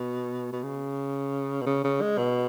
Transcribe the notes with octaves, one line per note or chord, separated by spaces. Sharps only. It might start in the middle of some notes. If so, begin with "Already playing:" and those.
Already playing: B2
B2
C#3
B2
C#3
C#3
G#3
B2